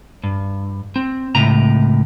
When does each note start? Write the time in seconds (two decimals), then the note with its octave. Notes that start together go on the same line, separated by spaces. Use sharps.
0.23 G2
0.96 C4
1.35 C#2 A2 C3 A#5